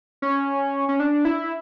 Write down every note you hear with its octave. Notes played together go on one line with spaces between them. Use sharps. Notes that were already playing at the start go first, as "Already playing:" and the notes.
C#4
C#4
D4
E4